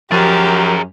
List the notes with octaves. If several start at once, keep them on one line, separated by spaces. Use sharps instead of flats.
F#2 F3 G4 G#4 A#4 A6